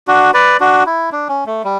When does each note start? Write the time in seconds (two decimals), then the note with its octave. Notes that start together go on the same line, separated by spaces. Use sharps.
0.08 D4 F#4
0.34 B4 D5
0.60 D4 F#4
0.86 E4
1.12 D4
1.29 C#4
1.47 A3
1.64 G3